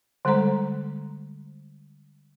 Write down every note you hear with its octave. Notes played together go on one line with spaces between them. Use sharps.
D3 G3 G#3 A4 C5 A#5